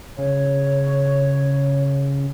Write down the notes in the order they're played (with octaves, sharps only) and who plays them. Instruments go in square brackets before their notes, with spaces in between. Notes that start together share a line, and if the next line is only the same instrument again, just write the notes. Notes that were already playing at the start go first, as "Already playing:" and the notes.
[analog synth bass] C#3 [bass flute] C#5